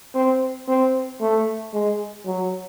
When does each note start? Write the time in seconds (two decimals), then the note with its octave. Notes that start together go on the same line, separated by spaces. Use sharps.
0.15 C4
0.68 C4
1.21 A3
1.74 G#3
2.26 F#3